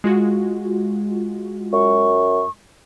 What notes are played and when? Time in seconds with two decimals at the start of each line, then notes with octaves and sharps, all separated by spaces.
0.04 G#3 F4 F#4
1.73 F#2 C#6